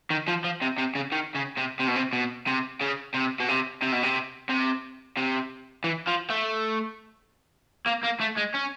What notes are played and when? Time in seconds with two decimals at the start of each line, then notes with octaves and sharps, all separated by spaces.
0.10 D#3
0.28 F3
0.44 F3
0.62 C3
0.78 C3
0.95 C#3
1.12 D#3
1.35 C#3
1.57 C3
1.79 C3
1.87 B2
1.96 C3
2.13 B2
2.47 C3
2.81 C#3
3.14 C3
3.40 B2
3.48 C3
3.82 C3
3.92 B2
4.03 C3
4.49 C3
5.17 C3
5.84 E3
6.07 F3
6.30 A3
7.87 A#3
8.04 A#3
8.21 A3
8.38 G#3
8.55 C#4